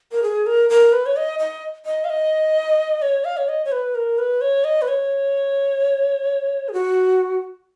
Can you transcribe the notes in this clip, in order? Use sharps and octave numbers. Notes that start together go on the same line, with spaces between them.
A#4
G#4
A#4
A#4
B4
C#5
D#5
D#5
D#5
F5
D#5
C#5
F5
C#5
D#5
C#5
B4
A#4
B4
C#5
D#5
B4
C#5
G#4
F#4